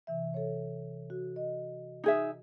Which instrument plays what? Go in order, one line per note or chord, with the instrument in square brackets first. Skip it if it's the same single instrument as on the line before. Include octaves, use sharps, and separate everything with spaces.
[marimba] C3 E3 E5
A4 C#5
F#4
D#5
[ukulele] D#4 G#4 E5